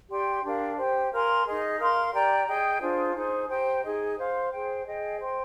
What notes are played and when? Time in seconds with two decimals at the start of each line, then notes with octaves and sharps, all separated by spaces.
0.09 G4 D5 G5 C6
0.43 D4 G4 A#4 F5
0.77 G4 C5 G5
1.11 A#4 F5 G#5 C6
1.46 D#4 G#4 D#5
1.79 A#4 F5 C6
2.13 G4 D5 G5 A#5
2.47 G#4 D#5 G5
2.81 D4 F4 G#4 C5
3.15 D#4 G#4 C5
3.49 G4 C5 G5 A#5
3.83 D#4 G#4 D#5
4.17 C5 F5 C6
4.52 G#4 C5 G5
4.85 G#4 D#5 G5
5.19 C5 G5 C6